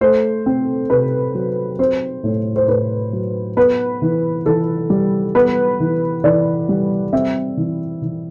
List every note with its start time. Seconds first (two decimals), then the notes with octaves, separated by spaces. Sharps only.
0.01 A3 C5
0.46 C4
0.90 C3 B4
1.35 F#3
1.79 C4 C5
2.24 A2
2.56 C5
2.68 A2 B4
3.13 F#3
3.57 B3 B4
4.02 E3
4.46 E3 A4
4.90 G3
5.35 B3 B4
5.80 E3
6.24 E3 D5
6.69 G3
7.13 C4 E5
7.57 E3
8.02 E3